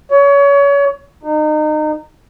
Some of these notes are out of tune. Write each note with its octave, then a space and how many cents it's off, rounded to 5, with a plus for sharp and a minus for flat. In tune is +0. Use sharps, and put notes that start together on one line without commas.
C#5 +30
D#4 -30